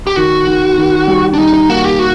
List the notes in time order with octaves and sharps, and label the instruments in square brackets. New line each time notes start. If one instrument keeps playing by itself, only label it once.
[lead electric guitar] G4
[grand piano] D#3 [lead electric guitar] F#4
[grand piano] D#3
D#3
G3
[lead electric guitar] D4
[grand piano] G3 [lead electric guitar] D#4
[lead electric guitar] D#4
[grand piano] A#3 [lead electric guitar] F#4
[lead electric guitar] G4
F#4